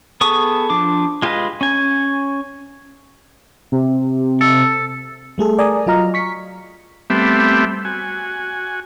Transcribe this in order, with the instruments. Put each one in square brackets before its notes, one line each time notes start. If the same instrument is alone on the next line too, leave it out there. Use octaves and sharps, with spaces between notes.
[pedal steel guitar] B3 G#4 A4 C#6 D#6
F3 D4 D6
G#3 F4 G4 B4 D#5
C#4 G#5
[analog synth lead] C3
[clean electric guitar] A4
[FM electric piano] G3 A3 G#4 A4
A#4 D5 G#5 A#5 D#6
F#3 F4 D#5 A#5 F6
C#6 B6 C#7
[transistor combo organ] G3 A3 B3 C4 G4 E5
F#4 G#5